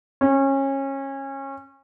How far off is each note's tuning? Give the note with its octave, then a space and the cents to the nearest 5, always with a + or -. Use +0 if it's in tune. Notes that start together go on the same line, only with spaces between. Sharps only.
C#4 -25